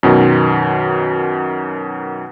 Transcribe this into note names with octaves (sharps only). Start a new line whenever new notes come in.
F#2 B2 D#3